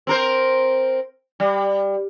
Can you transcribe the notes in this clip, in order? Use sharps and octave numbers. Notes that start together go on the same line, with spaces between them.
C4 A#4 C5
G3